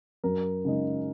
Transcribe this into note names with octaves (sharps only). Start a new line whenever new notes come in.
F#2 A#4
C#3 G#3 D#4